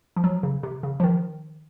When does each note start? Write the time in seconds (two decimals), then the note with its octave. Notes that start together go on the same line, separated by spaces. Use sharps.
0.16 F3
0.24 F#3
0.43 C#3
0.63 C3
0.83 C#3
1.00 F3
1.04 D#3